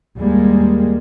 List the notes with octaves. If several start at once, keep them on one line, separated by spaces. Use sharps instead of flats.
D#2 G3 G#3 A#3